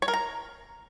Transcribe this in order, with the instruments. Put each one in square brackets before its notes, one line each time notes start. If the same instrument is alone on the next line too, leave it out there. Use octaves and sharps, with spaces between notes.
[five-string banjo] C#5
A#4
A#5